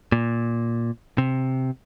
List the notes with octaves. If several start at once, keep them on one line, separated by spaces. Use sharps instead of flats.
A#2
C3